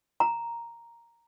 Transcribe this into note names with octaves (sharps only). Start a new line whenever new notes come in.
A#5